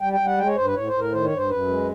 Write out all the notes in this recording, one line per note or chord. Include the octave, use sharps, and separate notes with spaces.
G3 G5
G5
G3
F#5
G#3 G5
C#5
G2 C5
B4
A2 C#5
C5
A2
A#4
D#3 C5
C#5
G2
C5
F#2 B4
G#3